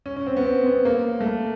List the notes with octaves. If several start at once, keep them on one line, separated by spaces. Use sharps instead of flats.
C#4
C#4
C4
B3
C4
B3
A#3
A3
A#3